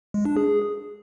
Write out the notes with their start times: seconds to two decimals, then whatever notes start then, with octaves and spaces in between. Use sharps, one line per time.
0.14 G#3
0.25 D4
0.37 G#4